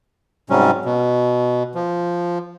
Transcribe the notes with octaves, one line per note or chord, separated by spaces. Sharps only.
G#2 C3 F#3 G3 C#4
B2
F3